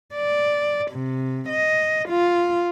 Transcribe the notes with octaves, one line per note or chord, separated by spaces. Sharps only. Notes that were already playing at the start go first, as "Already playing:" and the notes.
D5
C3
D#5
F4